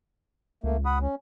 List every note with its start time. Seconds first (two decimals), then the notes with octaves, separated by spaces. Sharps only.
0.64 C#2 A3 A#3
0.86 F#5 B5 D#6
1.02 C#4